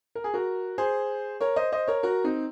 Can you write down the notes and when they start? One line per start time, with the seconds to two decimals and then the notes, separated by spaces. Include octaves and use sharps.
0.15 A#4
0.24 G#4
0.34 F#4 A#4
0.78 G#4 C5
1.41 A#4 C#5
1.56 C5 D#5
1.72 C5 D#5
1.88 A#4 C#5
2.03 F#4 A#4
2.24 C4 D#4